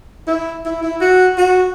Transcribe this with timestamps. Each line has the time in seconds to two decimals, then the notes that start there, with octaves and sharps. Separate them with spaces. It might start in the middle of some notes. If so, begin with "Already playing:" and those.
0.27 E4
0.65 E4
0.83 E4
1.01 F#4
1.38 F#4